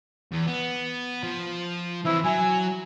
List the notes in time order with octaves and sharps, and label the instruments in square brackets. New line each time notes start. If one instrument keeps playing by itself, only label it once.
[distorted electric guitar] E2
B3
F3
[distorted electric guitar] E3 C4 [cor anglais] E4
[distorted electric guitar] F#3 [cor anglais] G#5